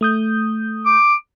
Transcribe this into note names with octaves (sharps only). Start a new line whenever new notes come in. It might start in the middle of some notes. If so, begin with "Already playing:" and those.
A3 D#6 G6
D6